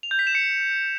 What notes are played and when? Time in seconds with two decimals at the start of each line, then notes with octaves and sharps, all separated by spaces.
0.03 F7
0.11 G6
0.19 B6
0.27 E7
0.35 C#7